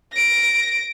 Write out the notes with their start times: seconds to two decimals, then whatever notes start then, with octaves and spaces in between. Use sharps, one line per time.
0.13 A#6 D7